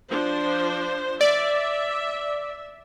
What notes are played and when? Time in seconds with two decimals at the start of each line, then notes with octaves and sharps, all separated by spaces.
0.11 F3 D4 C5
1.21 D5 E5